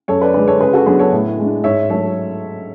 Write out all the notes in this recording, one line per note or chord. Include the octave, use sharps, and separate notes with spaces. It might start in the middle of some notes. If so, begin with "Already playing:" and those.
F#2 A4 C#5
B4 D5
D3 G#3 B4 D5
A4 C#5
C#3 G#4 B4
F#4 A4
F#3 B3 D4 G#4 B4
A4 C#5
A2
G#3 D4
G#2 C#5 E5
F#3 A3 A4 C#5